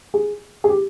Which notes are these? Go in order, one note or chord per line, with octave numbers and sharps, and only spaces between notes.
G#4
G#4
G4